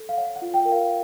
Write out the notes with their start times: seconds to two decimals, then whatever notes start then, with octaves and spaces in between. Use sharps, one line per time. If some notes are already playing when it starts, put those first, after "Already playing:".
Already playing: A4
0.09 F5
0.17 C#5 F#5
0.36 F#5
0.42 F4
0.54 G5
0.65 A#4
0.72 F5